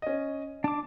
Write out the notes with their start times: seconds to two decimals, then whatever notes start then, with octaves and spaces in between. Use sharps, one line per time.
0.02 C#4 D#5
0.64 D4 A5 D6